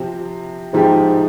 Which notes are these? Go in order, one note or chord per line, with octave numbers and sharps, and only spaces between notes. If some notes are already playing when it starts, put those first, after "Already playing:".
Already playing: C3 F3 C4 G4
G#2 C3 F3 C4 G4